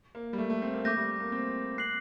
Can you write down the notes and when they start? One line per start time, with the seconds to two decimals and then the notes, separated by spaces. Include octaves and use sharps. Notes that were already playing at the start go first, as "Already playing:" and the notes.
0.15 A#3
0.33 G3
0.38 A3
0.50 A3
0.62 C4
0.73 A#3
0.85 A3 D6 G6 A#6
0.97 G3
1.20 A#3
1.32 C4
1.78 C4 F#6 C7 F#7